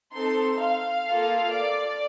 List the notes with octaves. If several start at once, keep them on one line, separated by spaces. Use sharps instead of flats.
C4 D#4 A4 C6
F5
A#3 F4 A4
D5